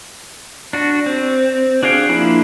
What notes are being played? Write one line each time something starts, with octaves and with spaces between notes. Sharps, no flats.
D4 F#4
C4
D4 F#4 G#4 F5 G5
F3 A#3 D4 E4